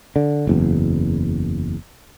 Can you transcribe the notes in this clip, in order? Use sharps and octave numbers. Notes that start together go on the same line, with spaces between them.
D3
F#1 E2